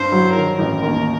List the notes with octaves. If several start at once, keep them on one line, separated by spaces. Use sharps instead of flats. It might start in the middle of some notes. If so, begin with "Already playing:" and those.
Already playing: G2 C5
F#3
D#3 A#4
A1
D#2